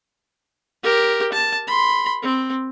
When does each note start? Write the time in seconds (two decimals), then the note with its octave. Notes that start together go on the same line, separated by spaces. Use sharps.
0.83 G4 A#4
1.33 A5
1.67 B5 C6
2.23 C4